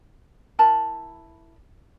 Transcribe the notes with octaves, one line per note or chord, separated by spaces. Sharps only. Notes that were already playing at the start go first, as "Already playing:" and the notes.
E4 A#4 A5 B5